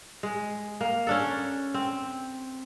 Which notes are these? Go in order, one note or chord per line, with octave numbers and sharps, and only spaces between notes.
G#3
A#3
C#4 D4 A4
C4